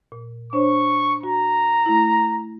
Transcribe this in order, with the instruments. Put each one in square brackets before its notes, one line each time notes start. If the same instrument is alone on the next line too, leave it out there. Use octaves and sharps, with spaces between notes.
[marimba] A#2
[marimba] D4 C5 C#5 [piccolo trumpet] C#6
[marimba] F#4 [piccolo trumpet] A#5
[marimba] A3 E4